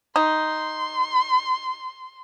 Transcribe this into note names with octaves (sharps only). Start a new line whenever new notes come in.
D#4 C6